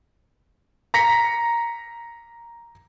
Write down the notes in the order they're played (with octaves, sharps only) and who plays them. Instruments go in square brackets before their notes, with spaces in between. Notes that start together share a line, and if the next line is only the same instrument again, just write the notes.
[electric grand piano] A#5 A#6 B6 C#7